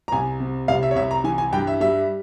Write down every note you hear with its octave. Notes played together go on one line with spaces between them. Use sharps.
A#5
C2 G#5
C3
C2 F5
E5
C#5
C2 E5
A#5
E3 G#5
G#5
G2 G5
E5
G3 E5